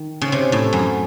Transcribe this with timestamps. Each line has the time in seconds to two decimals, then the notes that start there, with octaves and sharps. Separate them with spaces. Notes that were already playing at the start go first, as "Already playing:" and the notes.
Already playing: D#3
0.21 C#3
0.32 C3
0.52 A2
0.73 F#2